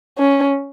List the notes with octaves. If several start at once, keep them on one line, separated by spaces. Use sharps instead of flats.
C#4